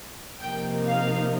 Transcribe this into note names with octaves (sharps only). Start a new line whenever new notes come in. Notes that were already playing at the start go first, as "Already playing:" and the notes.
C3 F3 A#3 D#4 G5
F5